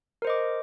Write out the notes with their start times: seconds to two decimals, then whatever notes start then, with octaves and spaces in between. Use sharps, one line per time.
0.22 A#4
0.25 C5
0.27 D#5
0.30 D6